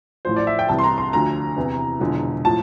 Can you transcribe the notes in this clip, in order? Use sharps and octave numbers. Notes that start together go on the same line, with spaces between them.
A1 A2 F3 C5
D5
E5
G5
C2 C3 E3 A5
C6
A#5
C6
D2 D3 F3 A#5
E2 C3 E3
E1 E2 D3 F3
A2 F3 A5